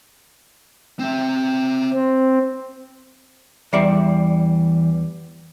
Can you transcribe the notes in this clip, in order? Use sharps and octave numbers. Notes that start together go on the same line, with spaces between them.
C4 E5
C4
E2 E3 G3 D5 E5 C7 C#7